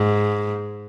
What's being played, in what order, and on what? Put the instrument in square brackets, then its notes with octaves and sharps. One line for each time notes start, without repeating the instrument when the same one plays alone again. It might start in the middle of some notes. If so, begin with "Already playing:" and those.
Already playing: [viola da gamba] G#2